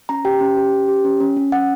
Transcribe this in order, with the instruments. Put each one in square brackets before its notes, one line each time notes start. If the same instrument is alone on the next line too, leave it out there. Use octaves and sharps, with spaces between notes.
[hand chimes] C#4 A#5
G4 G5
C#4
G4
C#4
G4
C#4
C#4
C#4
C#4 F#5